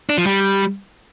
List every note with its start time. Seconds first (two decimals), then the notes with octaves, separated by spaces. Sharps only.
0.10 D4
0.18 F3
0.26 G3